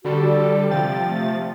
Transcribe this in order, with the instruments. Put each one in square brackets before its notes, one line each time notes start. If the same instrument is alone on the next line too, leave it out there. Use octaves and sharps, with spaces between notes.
[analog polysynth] D3 G3 A4 [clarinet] F#4
[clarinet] D5
[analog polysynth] C3 F3 A6 [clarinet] G5
[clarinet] A3